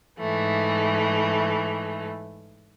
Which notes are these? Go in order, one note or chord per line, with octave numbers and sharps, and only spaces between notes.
G#2 E3 A3